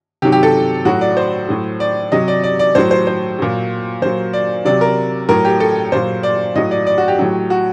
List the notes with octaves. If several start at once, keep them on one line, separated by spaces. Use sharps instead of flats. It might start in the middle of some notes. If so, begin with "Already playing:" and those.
C3 D#3 F#3 G4
G4
A4
A2 F#3 F#4
D5
C5
A2 F#3
D5
C3 F#3 D#5
D5
D5
D5
A2 F#3 C5
C5
C5
A#2 F#3
A#2 F#3 C5
D5
C3 F#3 D5
A#4
A2 F#3 A#4
G4
A4
A#2 F#3 C5
D5
A2 F#3 D#5
D5
D5
F#4
G4
A2 F#3
F#4